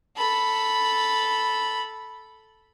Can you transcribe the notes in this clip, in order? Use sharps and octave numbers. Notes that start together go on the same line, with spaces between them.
A4 B5